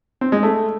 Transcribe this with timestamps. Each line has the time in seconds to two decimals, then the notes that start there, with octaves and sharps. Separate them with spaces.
0.21 C4
0.32 G#3
0.43 A3